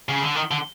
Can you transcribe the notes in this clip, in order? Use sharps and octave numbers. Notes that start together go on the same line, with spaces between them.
C#3
D3
D#3
D3